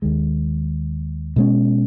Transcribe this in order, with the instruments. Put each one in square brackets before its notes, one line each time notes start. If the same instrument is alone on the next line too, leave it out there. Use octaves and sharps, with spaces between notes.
[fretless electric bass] D#2 D#3 G#3
B2 G#3 C#4